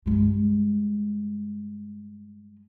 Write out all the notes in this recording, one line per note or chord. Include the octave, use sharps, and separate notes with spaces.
G2 G#3